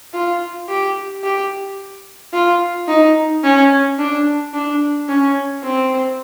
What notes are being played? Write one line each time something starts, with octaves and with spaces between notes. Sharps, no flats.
F4
G4
G4
F4
D#4
C#4
D4
D4
C#4
C4